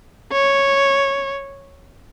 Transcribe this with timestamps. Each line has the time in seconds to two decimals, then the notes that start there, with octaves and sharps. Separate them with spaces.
0.32 C#5